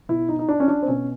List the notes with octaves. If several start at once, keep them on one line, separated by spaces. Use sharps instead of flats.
B2 E4
D#4
D#4
D4
C#4
D4
C4
B2 C#4